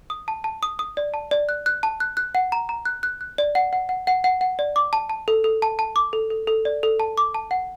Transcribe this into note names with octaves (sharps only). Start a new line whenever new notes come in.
D#6
A5
A5
D#6
D#6
D5
A5
D5
F#6
F#6
A5
F#6
F#6
F#5
A#5
A#5
F#6
F#6
F#6
D5
F#5
F#5
F#5
F#5
F#5
F#5
D5
D6
A5
A5
A4
A4
A5
A5
D6
A4
A4
A4
D5
A4
A5
D6
A5
F#5